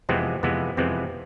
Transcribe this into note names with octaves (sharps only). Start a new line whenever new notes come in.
F2 C3 E3 G#3 B3 C4
F2 C3 E3 G#3 B3
F2 C3 E3 G#3 B3 C4